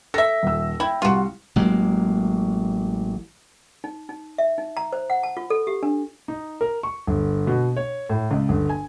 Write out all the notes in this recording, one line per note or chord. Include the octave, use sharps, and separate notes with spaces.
A4 E5 A#6
D#1 E6
E4 G5
C2 G3 F4 F#4
A1 F#3 G#3 A#3
D#4
D#4
E5
D#4
A#5
C5
F#5
A5
F4
A4
G4
D4
D#4
A#4
C#6
G1
B2
C#5
A2
C#2
G1
G#5